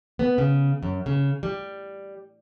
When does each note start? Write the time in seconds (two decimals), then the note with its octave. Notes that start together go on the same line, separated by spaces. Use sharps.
0.19 B3
0.38 C#3
0.83 F#2
1.06 C#3
1.43 G3